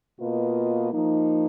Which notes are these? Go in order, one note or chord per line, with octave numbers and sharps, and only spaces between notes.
B2 A#3 F4 B4 D#5
F3 A#3 D#4